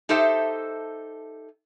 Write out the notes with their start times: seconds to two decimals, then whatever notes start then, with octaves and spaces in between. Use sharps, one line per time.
0.09 D#4 G4 A4 C5 E5